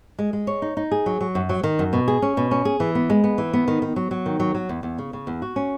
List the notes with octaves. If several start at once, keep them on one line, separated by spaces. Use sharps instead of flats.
G#3
G#3
C#5
D#4
D#4
G#4
F#3
F#3
F#2
F#3
D#3
F#2
B2
G#4
C#4
B2
C#4
G#4
E3
B3
G#3
B3
E3
B3
D#3
D#3
F#3
F#3
D#3
F#3
F#3
E2
E2
C#3
C#3
E2
F#4
C#4